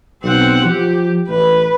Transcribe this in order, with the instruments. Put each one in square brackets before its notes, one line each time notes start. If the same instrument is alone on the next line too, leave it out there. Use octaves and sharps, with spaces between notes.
[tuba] B1 [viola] C4 F#5
[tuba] F3 [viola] G4
[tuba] A1 [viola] B4